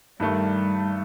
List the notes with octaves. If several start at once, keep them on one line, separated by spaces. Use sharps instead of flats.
G2 D#3 G3 A3